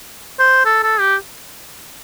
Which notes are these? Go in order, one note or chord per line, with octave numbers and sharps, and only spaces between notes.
C5
A4
A4
G4